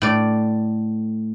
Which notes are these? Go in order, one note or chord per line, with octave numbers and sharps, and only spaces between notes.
A2 D5